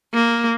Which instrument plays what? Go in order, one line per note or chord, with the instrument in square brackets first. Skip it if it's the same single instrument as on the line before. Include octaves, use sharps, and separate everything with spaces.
[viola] A#3